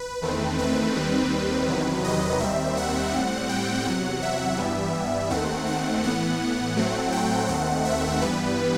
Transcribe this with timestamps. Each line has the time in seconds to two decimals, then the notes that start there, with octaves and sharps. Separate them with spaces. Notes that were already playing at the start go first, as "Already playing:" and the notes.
Already playing: B4
0.22 E2 D#3 A3 C4
0.59 B4
0.95 D#2 D#3 G3 C4
1.67 E2 C3 D#3 F#3
2.04 D#5
2.40 D#2 D#3 G3 C4 E5
2.77 F#5
3.13 A2 G3 C4
3.49 G5
3.85 E2 C3 F#3 F#5
4.22 E5
4.58 G2 E3 G3 B3
5.30 D#2 D#3 A3 C4 F#5
5.67 F#5
6.03 A2 E3 B3 F#5
6.76 A2 F#3 A3 C4
7.12 G5
7.48 D#2 D#3 A3 C4 F#5
7.85 E5
8.21 G2 E3 G3 B3 B4